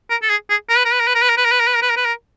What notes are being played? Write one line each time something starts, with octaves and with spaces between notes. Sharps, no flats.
A#4
A4
G#4
G#4
A#4
B4
A#4
B4
A#4
B4
A#4
B4
A#4
B4
A#4
B4
A#4
B4
A#4
B4
A#4
B4
A#4